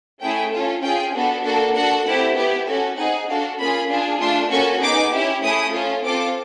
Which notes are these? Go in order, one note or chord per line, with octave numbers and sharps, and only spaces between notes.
A3 C#4 E4 G#4 G5
C#4 F4 A4
C#4 F4 G#4 G5
B3 D4 F#4 A4
A#3 D4 F#4 A4
D4 F#4 A4 F#5
A3 C4 E4 G4
B3 E4 G4
C#4 F#4 A4
C4 D#4 G#4 F#5
D4 F#4 A4 F5
A#3 C#4 F4 G#4 B5
D4 F4 G#4
A3 D4 F4 C6
A#3 C#4 F#4 A4 C#6
B3 D#4 G#4 D6
C#4 E4 G4
A3 C#4 E4 G#4 D#6
C#4 F4 A4
C4 F4 A4 D6